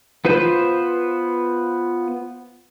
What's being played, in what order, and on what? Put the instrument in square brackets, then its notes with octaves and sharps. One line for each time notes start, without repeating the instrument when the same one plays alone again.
[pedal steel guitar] B3 F4 B4 C5 G6